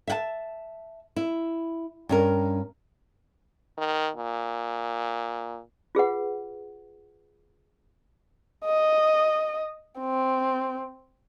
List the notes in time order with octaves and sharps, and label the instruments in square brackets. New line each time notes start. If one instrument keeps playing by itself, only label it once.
[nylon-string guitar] E5 F#5 A5
E4
G2 C#4 A#4
[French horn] D#3
A#2
[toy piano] F4 G#4 B4 F#5
[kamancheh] D#5
C4